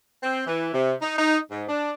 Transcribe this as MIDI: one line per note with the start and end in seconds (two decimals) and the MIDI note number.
0.23 0.42 60
0.47 0.70 52
0.74 0.94 48
1.02 1.17 63
1.19 1.39 63
1.51 1.64 44
1.69 1.93 62